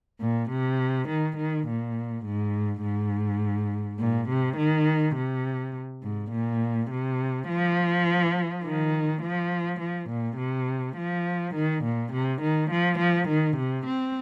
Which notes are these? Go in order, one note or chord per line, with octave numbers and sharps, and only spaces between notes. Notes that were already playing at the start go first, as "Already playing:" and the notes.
A#2
C3
D#3
D#3
A#2
G#2
G#2
A#2
C3
D#3
C3
G#2
A#2
C3
F3
D#3
F3
F3
A#2
C3
F3
D#3
A#2
C3
D#3
F3
F3
D#3
C3
C4